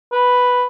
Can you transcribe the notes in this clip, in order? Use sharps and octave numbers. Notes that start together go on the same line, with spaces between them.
B4